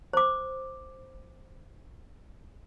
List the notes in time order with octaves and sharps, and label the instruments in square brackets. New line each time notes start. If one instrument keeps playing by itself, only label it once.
[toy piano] C5 D6